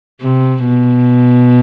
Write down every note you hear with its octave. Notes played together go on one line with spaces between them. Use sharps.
C3
B2